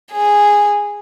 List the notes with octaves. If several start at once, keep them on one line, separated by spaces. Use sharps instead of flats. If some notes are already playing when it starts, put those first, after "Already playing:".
G#4